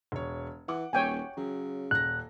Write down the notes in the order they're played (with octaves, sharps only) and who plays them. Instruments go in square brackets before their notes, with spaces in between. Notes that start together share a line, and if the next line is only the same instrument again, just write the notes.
[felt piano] E1 C#5
[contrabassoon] E3 [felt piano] F#5 D6
[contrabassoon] D#1 [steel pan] C#5 G5 G#5
[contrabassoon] C#3 [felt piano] F#3
[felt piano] D#1 A#6 [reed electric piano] F#6